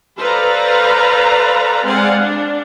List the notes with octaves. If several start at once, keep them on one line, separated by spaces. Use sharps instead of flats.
A4 B4 C5 D5 F5 A#5
G#3 C4 D5 F5 F#5 G#5
D4